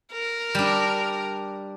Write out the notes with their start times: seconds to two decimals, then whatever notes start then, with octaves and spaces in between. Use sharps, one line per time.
0.13 A#4
0.55 G3 D4